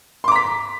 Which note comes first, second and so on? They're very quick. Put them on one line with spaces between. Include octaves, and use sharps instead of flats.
C6 D6 A#5 B6